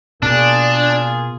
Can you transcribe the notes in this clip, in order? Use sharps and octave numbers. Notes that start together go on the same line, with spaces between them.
B2 A#3 D4 F4 G#4